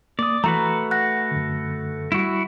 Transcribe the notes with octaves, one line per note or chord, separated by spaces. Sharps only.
A#3 D5 D#6
E3 A3 F#4 B4 A#5
F#5 F#6 A#6
F#2 D3
G3 E4 F#4